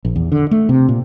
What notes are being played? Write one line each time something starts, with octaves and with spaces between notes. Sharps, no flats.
A#1
E2
D3
A3
C3
A#2